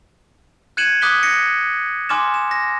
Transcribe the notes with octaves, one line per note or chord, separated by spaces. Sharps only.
F#6 G#6 C#7 D#7 E7 F#7
D6 D#6 F#6 B6 G7
A#6 C#7 D#7
G#5 C6 D6 F6 A6 E7
E7
A#6